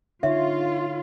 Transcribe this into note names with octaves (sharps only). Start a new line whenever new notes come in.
D3 D#4 F4 C#5 E5